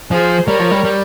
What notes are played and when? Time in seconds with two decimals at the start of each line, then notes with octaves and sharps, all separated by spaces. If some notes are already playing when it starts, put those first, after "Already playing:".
0.10 F3 G#4 C5
0.47 G3 A#4 C#5
0.60 F3
0.71 G3
0.84 G3